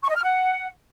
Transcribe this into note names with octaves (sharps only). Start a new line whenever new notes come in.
C#6
D#5
F6
F#5